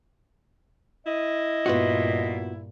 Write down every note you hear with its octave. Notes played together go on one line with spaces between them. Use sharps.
E4 D#5
G2 A#2 B3 F4 F#4